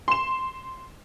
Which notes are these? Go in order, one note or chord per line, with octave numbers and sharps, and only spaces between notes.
C6 E7